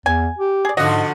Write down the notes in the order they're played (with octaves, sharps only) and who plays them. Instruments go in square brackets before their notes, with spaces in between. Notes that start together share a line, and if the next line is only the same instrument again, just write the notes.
[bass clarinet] E2 [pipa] G#5
[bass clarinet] G4
[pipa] G#4 D5
[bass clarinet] G#2 [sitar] D3 F3 F#4 [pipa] D#5